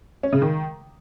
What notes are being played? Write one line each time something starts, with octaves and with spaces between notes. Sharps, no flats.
C#4
C#3
D#3